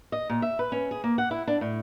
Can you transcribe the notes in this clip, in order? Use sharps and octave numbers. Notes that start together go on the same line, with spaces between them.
D#5
A#2
E5
B4
C#4
G#4
A#3
F#5
E4
D4
A2